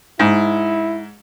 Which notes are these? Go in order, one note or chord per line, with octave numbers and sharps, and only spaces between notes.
G#2 E4